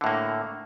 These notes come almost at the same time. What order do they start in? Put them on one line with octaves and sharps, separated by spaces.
D3 A2 A#3